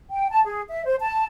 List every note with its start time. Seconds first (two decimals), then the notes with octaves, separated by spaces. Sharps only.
0.10 G5
0.31 A5
0.45 G#4
0.69 E5
0.86 C5
1.00 A5